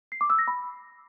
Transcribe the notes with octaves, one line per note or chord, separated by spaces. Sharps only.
C7
D6
E6
A#6
B5